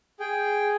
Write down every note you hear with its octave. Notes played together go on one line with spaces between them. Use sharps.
G#4 G5